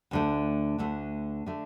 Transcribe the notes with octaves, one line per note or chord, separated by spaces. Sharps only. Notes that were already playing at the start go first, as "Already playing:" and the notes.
D2 D3 A3
D2 D3 A3
D3 A3